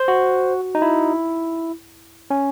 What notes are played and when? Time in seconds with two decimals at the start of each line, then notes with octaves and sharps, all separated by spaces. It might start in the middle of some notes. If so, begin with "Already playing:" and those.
Already playing: C5
0.08 F#4
0.75 D#4
0.82 E4
2.30 C#4